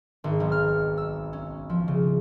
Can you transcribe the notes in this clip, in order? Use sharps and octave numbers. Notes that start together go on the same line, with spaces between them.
G#1
B1
F6
E6
C#4
F3
C#3